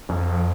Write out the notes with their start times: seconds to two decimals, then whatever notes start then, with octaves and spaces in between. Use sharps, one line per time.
0.09 F2